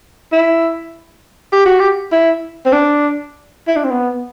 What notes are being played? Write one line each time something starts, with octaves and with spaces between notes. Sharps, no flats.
E4
G4
F#4
G4
E4
C4
D4
E4
D4
C4
B3